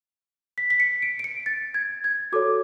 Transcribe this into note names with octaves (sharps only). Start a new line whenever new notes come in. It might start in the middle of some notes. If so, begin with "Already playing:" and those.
B6
B6
C#7
D7
D7
C#7
A6
G#6
G#6
F#4 A4 C#5 D6